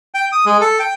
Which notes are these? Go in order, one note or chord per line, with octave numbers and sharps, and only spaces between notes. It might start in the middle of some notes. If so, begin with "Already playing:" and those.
G5
D#6
G#3
A4
G5